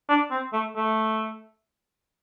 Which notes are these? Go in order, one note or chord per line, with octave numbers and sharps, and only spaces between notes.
D4
C4
A3
A3